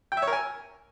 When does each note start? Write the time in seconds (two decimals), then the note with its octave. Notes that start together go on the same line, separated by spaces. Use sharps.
0.12 G5
0.17 E5
0.22 C#5
0.27 A#4
0.33 G#5